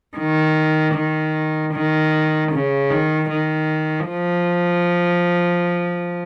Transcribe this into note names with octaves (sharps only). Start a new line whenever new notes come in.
D#3
D#3
D#3
C#3
D#3
D#3
F3